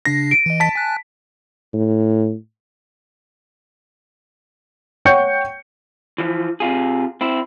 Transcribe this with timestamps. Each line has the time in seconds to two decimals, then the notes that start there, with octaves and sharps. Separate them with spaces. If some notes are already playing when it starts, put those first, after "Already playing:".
0.05 C#3 D4 A#6 C7
0.31 D7 D#7
0.46 E3 D#5
0.60 A5 B6
0.75 G#5 F#6
1.74 A2
5.05 C#5 F#5 G5 C#6 G6 C#7
6.18 E3 F3
6.60 C3 F4 G#4
7.21 C4 E4